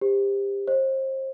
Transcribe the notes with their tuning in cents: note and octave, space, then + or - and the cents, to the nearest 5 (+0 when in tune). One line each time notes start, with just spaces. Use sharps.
G4 +25 C5 +0
C5 +30 D#5 +0